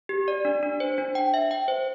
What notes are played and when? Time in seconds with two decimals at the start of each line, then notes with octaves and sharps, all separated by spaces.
0.09 G4
0.28 D5
0.45 D4
0.63 D4
0.80 C5
0.98 D4
1.15 G5
1.34 E5
1.51 G5
1.68 C5